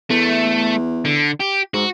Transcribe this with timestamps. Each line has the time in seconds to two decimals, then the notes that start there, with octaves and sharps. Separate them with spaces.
0.10 E2 A3
1.05 D3
1.40 G4
1.74 G#2 F#4